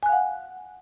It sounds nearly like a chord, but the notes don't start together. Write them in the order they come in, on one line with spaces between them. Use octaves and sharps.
G#5 F#6 F5 F#5